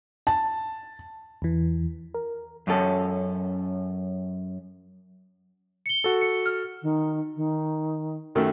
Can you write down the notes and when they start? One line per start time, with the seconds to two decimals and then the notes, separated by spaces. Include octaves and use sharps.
0.27 A5
1.42 E2 E3
2.15 A#4
2.67 F#2 C#4 A4
5.86 C#7 G7
6.04 F#4 A4
6.21 C#7
6.46 F6
6.82 D#3
7.36 D#3
8.35 F#2 D#3 A3